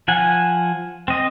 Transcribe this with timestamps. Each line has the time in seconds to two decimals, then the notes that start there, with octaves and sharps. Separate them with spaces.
0.08 F3 F#5 G#5
1.08 C4 D#5